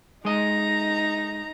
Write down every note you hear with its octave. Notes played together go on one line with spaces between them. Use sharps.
G#3 D#4 D#5 A#5